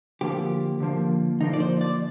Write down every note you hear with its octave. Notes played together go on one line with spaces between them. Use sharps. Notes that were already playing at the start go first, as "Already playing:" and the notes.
D3 F3 A#3 G4
D3 F3 A#3
D3 F3 A#3 D#4
D5
C5
D5